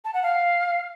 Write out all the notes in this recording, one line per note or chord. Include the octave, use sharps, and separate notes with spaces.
A5
F#5
F5